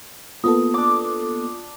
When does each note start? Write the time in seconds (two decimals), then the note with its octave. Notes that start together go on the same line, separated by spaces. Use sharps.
0.44 A#3 B3 F4 A4 D#6
0.74 D4 D6